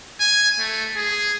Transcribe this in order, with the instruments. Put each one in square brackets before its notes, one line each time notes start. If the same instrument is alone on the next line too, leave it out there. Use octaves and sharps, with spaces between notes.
[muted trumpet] G#5
A3
G#4